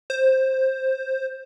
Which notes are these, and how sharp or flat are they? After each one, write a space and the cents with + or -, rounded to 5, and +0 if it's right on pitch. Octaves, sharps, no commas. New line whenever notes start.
C5 +10